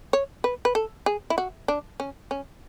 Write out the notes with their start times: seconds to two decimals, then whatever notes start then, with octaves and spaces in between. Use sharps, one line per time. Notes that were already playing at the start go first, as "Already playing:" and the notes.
0.13 C#5
0.44 B4
0.65 B4
0.75 A4
1.06 G#4
1.30 E4
1.38 F#4
1.68 D4
2.00 C#4
2.31 C#4